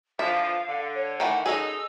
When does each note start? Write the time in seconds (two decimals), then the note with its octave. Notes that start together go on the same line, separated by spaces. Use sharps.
0.19 D3 E3 F3 E5 F5
0.68 D3
0.94 C#5
1.20 D#3 E3 A3 F#5
1.46 F#2 F#3 D#4 G#4 A4 D#5 E6